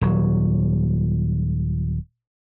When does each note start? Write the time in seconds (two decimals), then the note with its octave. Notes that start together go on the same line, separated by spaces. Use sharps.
0.01 D#1 F#3